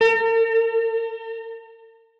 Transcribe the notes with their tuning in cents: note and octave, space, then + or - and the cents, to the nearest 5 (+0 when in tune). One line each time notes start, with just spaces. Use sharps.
A#4 -45